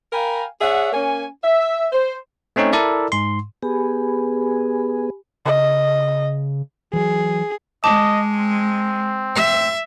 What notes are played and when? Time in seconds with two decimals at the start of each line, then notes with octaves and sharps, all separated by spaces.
0.13 A#4 F5 G5 G#5 A#5 B5
0.61 G#4 C#5 D5 E5 F#5
0.93 A#3 C#4 C#5 G#5
1.44 E5
1.92 C5
2.56 A3 C4 C#4 D#4 C#5
2.73 E4 A4 A#4 D5 E5
3.12 G#2 C6
3.63 B3 G4 G#4 G#5 B5
5.45 C#3 D#5
6.93 E3 F#3 G#4
7.84 G#3 D#5 A5 D6
8.37 C4
9.36 E5